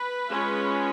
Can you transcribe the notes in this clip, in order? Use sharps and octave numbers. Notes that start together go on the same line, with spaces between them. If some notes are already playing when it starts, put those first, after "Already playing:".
Already playing: B4
G#3 C#4 F4